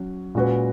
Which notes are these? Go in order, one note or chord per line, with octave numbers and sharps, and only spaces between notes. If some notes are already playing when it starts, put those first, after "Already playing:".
Already playing: F#3 C#4 F#4
A#2 G#3 C#4 F#4 B4